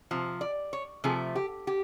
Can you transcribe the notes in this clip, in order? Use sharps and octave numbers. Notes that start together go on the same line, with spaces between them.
C3 F3
D5
C#5
C3 F3 A3 G#4
G4
G4